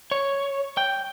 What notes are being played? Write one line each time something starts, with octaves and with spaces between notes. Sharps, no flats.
C#5
G5